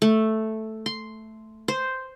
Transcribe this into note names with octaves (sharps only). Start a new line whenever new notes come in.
A3
C6
C5